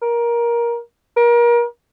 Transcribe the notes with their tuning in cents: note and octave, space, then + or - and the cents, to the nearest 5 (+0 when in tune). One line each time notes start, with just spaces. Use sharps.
A#4 +15
A#4 +30